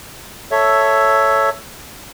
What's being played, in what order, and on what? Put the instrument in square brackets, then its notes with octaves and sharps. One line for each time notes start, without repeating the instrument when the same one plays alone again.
[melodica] A4 C#5 E5